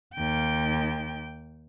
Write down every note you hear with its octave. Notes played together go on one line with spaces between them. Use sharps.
D#2 G5